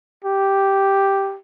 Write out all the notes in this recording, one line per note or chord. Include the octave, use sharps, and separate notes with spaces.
G4